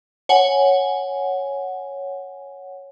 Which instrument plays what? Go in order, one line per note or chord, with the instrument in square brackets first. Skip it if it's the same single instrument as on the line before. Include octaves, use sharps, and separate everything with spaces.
[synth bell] C#5 F#5 G#5